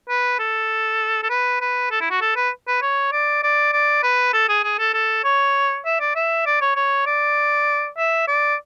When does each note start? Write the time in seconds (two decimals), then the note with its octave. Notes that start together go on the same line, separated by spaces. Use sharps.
0.09 B4
0.39 A4
1.23 A4
1.30 B4
1.61 B4
1.91 A4
2.01 E4
2.11 F#4
2.22 A4
2.36 B4
2.67 B4
2.82 C#5
3.13 D5
3.43 D5
3.73 D5
4.03 B4
4.33 A4
4.49 G#4
4.64 G#4
4.79 A4
4.94 A4
5.24 C#5
5.86 E5
6.00 D5
6.16 E5
6.46 D5
6.61 C#5
6.76 C#5
7.06 D5
7.98 E5
8.28 D5